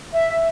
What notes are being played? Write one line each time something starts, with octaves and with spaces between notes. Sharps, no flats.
E5